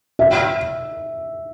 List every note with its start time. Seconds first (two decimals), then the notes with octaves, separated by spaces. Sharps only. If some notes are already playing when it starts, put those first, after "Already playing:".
0.19 E5